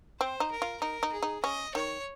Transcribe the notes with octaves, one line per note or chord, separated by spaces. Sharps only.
C4 C5
D#4
A#4
F4
D#4 A#4
D#4
G#4
D#4
C#4 D#5
D#3 C#5